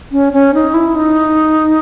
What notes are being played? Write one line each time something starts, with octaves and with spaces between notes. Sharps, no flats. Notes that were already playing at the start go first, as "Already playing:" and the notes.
C#4
C#4
D#4
E4
D#4